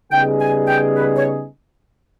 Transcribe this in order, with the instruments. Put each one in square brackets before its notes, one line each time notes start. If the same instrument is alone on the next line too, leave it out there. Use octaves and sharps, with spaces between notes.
[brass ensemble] C#3 G3 B3 D#4 G#4 [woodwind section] G5
[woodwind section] G#5
G5
B4
C#5